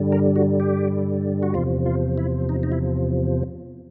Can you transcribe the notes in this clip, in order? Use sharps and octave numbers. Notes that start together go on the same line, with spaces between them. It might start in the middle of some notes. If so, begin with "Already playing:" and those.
Already playing: G2 D3 G3
A#4
F#4
G4
F#4
E2 C3 F3 F4
F4
E4
D#4
D#4
E4